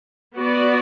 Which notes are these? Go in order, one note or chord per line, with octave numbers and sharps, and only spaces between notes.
B3 F#4 D5